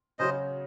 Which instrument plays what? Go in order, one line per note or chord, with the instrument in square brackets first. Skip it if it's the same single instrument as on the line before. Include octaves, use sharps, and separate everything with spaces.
[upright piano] C#3 F#3 C#4 F#4 [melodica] C5 D#5